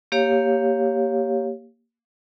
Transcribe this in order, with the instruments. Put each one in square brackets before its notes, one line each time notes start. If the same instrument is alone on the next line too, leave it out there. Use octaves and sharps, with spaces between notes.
[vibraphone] A#3 G4 C#5 F5